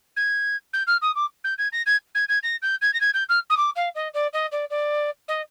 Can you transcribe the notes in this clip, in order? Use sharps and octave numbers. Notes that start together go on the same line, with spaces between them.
G#6
G6
F6
D#6
D6
G6
G#6
A#6
G#6
G#6
G#6
A#6
G6
G#6
A#6
G#6
G6
F6
D#6
D6
F5
D#5
D5
D#5
D5
D5
D#5